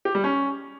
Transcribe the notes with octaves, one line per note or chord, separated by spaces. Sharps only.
G4
G3
C#4